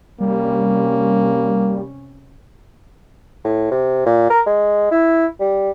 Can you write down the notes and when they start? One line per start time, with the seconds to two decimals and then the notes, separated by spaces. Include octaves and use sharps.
0.20 C3 G3 A#3 C#4
3.45 A2
3.71 C3
4.06 A#2
4.30 A#4
4.46 G#3
4.91 E4
5.40 G3